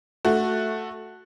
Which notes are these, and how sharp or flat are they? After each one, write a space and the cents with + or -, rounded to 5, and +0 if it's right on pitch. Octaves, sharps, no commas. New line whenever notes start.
A3 +0 F#4 -5